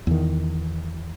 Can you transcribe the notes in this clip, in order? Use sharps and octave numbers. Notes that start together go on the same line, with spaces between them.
E2 D#3